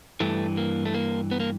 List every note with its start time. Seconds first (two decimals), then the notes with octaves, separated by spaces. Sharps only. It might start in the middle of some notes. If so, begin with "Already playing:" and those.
0.20 G2 E3 A3
0.57 A#3
0.85 A3
0.94 A#3
1.31 B3
1.40 A#3